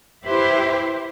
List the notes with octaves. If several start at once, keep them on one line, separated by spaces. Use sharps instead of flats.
E4 G4 B4 C5 E5